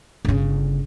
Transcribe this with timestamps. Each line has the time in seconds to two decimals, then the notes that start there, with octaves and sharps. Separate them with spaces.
0.25 G1 C#3